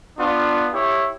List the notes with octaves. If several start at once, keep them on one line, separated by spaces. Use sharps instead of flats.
B3 D4 F4
E4 G4 C#5